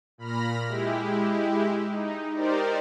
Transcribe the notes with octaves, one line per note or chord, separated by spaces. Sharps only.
A#2 B5 F6 A#6
G#3 E4 G4
D#4
D#4 G4 A#4 C5 D5